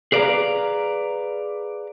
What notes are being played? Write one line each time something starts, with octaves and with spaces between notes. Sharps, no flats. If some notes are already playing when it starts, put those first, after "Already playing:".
G#4 B4 D5 D#5 F5 A#5